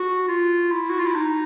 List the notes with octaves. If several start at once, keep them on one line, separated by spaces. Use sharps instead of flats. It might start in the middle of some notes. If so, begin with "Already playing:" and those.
Already playing: F#4
F4
E4
F#4
F4
E4
D#4